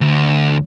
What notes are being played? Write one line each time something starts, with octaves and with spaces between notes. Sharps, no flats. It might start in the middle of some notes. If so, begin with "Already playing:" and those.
D2